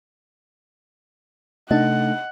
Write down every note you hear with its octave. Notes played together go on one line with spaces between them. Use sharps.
C3 A3 D4 D#4 D#5 F#5